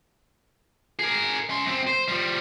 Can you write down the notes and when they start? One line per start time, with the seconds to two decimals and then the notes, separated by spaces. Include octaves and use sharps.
0.99 G#4 A#4
1.50 C#4 C6
1.66 F#2 C4
1.87 C5
2.08 F3 G3